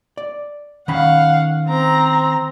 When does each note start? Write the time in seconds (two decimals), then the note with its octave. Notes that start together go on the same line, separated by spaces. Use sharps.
0.17 D5
0.88 D#3 C#4 F5 F#5 B5
1.67 C4 A#5